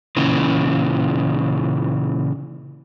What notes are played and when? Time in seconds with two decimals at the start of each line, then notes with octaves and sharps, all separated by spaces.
0.17 A#2 C#3 E3